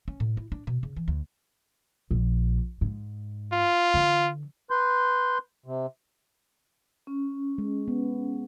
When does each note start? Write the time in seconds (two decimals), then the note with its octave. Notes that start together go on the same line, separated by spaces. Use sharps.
0.08 C#4
0.20 A2
0.37 E4
0.52 D4
0.67 B2
0.83 C#3
0.96 E3
1.08 D2
2.11 A#1
2.81 G#2
3.53 F4
3.94 D3 E3
4.71 B4 C6 G6
5.66 C3
7.07 C#4
7.58 G#3
7.88 B3